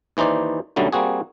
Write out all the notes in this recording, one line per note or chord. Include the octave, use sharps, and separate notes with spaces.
D#2 E3 D#4 C5 D5
B1 F#2 D3 F#3 G3 A3
G3 A#3 C4 F#4 G#4